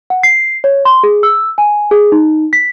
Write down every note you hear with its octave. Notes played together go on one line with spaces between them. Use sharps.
F#5
C7
C#5
C6
G#4
E6
G#5
G#4
D#4
B6